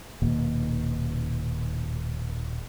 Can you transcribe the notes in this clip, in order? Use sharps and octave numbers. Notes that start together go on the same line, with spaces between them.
D#1 B2 D#3 A#3